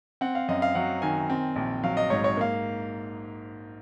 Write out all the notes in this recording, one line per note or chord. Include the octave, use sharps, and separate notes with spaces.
C4 F#5
F5
F#2 D#5
F5
F#3 F#5
D#3 G#5
C4
A#1
F#3 F5
D#5
G#2 C#5
C#5
A#3 F5